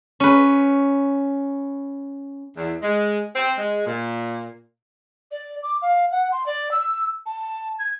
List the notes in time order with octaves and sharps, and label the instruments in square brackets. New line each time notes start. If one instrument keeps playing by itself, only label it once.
[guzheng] C#4 B4
[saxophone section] E2
G#3
C4
G#3
A#2
[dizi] D5
D6
F5
F#5
C6
D5
E6
A5
G#6